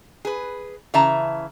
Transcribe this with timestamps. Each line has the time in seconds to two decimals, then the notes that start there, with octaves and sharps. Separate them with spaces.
0.25 G#4 B4
0.94 C#3 E3 E5 A5 A#5